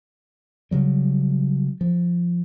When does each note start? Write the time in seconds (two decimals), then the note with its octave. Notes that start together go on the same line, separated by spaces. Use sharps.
0.71 C#3 F#3 G3
1.81 F3